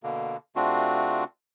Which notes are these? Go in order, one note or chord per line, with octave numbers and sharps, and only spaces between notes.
B2 D3 A#3
C3 A3 C4 D4 F4 F#4